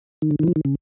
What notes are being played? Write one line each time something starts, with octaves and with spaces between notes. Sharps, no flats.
D#3
D3
D#3
E3
F3
D#3
C#3